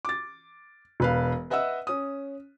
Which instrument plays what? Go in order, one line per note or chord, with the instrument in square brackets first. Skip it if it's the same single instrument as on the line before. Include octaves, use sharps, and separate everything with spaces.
[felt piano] D6 A6
E1 B4 F5
B4 D#5 E5 F#5 E6
C#4 D#6